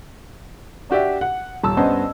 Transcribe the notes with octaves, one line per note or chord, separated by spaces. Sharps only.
D4 F#4 G4 D5 E5
F#5
D#1 A5 E6
G2 B3 C#4 C5 D#5 A5